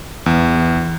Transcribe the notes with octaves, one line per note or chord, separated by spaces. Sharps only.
E2